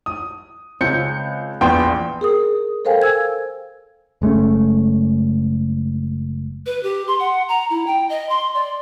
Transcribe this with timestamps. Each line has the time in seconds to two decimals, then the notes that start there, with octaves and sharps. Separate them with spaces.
0.06 D#6
0.81 C#2 C4 G6 C#7
1.61 A#1 E2 B3 G5 C6
2.21 G#4 A#4 D#6
2.85 A4 A#4 C5 F5 G5 G#5
3.02 G#5 E6 G#6
4.22 F#1 G#3 A3 C#4
6.66 B4
6.83 G4
7.08 C6
7.20 F#5
7.49 A#5
7.70 E4
7.87 G5
8.09 D#5
8.29 C6
8.55 D5